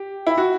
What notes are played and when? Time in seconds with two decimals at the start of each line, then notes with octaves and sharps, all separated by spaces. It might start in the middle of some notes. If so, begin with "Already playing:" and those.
Already playing: G4
0.27 E4
0.38 F#4